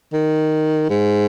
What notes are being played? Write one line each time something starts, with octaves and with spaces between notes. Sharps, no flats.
D#3
G#2